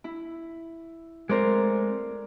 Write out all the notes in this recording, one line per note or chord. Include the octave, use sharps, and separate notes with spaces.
E4
G#3 A3 C4 A#4 C5 D5